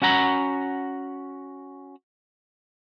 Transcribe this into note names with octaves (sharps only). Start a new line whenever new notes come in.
C#4 F#4 F#5 A#5 B5